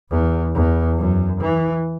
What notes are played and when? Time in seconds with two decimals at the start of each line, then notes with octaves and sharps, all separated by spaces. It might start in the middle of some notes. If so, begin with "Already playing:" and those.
0.10 E2
0.54 E2
0.98 F#2
1.41 E3